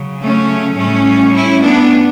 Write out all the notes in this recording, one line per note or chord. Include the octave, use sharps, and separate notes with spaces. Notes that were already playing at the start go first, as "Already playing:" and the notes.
Already playing: C#3 F#3
A3 C#4
A2 G3 A3 C#4
C#4 E4
B3 D4